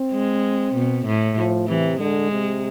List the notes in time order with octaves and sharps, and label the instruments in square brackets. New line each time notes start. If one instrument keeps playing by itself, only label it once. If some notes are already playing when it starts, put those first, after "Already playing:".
Already playing: [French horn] C4
[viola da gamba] G#3
B2
A2
[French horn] F3
[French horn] C3 [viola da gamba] E3
[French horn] D3 [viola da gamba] G#3
[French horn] C3